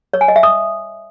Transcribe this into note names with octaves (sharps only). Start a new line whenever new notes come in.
C#5
G#5
D#5
E5
D#6